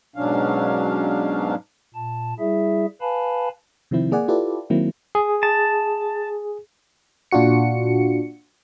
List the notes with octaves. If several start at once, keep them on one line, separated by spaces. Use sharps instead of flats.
G#2 B2 F#3 C#4 D4 F5
A#2 A5
G3 E4 G#4 E5
B4 F5 G#5 A5 B5
C3 D#3 F3 C4 E4
A#3 G#4 D5 F#5 G#5
E4 F4 G4 A4 B4 D5
D#3 F#3 A#3 C4 E4
G#4
A5
A#2 D4 F4 F#4 C#7